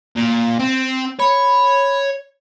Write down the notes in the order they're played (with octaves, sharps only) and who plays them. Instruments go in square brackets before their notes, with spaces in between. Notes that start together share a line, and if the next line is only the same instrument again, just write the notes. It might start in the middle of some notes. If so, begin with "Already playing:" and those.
[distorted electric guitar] A#2
C4
[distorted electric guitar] C#5 [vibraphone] B5